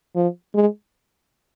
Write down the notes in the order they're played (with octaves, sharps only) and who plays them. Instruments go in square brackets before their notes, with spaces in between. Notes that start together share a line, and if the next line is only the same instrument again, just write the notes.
[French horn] F3
G#3